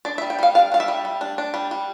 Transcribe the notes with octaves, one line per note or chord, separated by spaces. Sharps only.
D4 D5
E5
G3
G5
G3 F5
D4 F5
D4 F5
E5
G3
G3
D4
D4
G3
G3